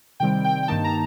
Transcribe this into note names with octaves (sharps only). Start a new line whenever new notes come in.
C3 D#3 G3 C4 G5
G5
G5
G2 D#3 A#3 D#4 A5
A#5